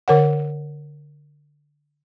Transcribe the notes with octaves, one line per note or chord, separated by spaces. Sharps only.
D3 A#4 C#5 F#5